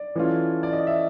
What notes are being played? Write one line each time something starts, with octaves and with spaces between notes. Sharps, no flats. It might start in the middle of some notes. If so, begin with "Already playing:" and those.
Already playing: D5
E3 A3 C#4 F4
D5
D#5
E5